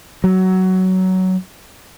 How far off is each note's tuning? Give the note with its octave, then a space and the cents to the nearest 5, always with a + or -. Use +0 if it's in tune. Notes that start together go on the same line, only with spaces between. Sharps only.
F#3 +15